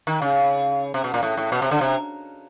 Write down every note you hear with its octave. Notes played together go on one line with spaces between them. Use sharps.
D#3
C#3
C3
B2
A#2
A2
A2
B2
C3
D3
C3